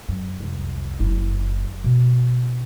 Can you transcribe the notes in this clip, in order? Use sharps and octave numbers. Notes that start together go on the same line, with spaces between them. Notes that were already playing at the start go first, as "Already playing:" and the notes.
F#2
C2 F2
F#1 E4
B2